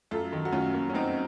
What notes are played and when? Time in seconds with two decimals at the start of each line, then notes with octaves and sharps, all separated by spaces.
0.11 F#2 F4 A4
0.32 D#3
0.45 F#4
0.52 F#2 C#4 F4
0.74 A#3
0.90 C#4
0.94 F#2 C4 D#4